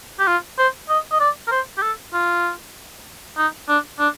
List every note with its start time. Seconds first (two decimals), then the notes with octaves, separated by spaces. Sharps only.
0.19 G4
0.27 F4
0.58 C5
0.89 D#5
1.12 D#5
1.20 D5
1.47 A#4
1.51 C5
1.77 G4
1.82 A4
2.13 F4
3.37 D#4
3.68 D4
3.99 D4